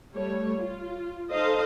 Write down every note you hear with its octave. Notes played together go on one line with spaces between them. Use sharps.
G3 A3 C#5
F4
D#4 A4 C5 D#5 F5